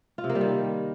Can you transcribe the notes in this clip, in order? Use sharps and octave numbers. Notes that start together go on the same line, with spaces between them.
F4
C3
A#3
G3
D#3